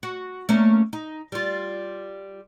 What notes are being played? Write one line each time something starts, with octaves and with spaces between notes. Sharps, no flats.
F#4
A3 A#3 C#4
D#4
G3 F4